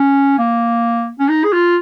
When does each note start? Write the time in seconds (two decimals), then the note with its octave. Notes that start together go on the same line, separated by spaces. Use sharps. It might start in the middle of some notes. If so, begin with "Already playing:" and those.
Already playing: C#4
0.38 A#3
1.19 C#4
1.29 D#4
1.44 G#4
1.53 F4